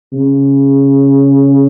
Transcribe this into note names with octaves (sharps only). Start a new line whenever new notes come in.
C#3